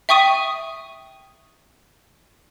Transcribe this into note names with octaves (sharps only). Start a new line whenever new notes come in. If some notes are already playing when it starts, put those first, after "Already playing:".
E5 G5 C#6 D#6 D#7